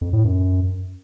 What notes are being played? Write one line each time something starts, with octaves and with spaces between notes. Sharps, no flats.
F2
A2
F#2